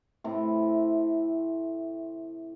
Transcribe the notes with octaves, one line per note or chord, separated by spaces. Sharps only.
A2 C3